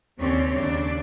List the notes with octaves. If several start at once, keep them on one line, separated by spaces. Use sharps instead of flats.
D#2 C#3 C4 C#4 C#5 D5
D#2 C#3 D4 D5